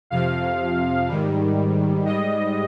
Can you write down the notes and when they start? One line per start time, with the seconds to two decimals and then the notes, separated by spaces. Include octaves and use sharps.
0.10 F2 C3 F3 F5
1.08 G#2 D#3 G3
2.06 G#2 G3 D#5